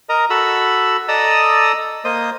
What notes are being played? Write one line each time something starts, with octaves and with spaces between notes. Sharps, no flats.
A#4 D#5 A#5
F#4 A4 B5 E6
A4 D5 D#5 A#5 D#6 E6
A#3 C5 D#5 D#6